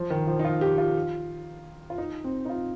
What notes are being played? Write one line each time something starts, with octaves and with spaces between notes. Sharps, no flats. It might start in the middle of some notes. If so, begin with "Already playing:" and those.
Already playing: F3
D#3
F3
D#4
F4
G4
F4
F4
D#4
C4
D#4
F4